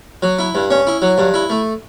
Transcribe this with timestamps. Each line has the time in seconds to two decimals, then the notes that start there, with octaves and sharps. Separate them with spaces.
0.23 F#3
0.39 E4
0.55 G2
0.71 C#4
0.87 E4
1.02 F#3
1.18 G2
1.34 E4
1.50 A3